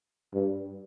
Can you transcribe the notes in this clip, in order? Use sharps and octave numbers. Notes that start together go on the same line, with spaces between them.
G2